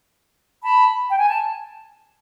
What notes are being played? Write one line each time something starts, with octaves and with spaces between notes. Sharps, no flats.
A5 B5
G5
G#5
A5